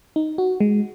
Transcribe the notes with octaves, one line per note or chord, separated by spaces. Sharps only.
D#4
F#4
G#3